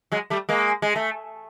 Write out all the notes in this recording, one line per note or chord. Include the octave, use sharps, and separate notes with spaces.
F#3 G#3
G3 A3
G#3 A#3
G#3
A3